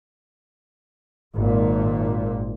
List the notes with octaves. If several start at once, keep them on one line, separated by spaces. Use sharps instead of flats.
G#1 A#2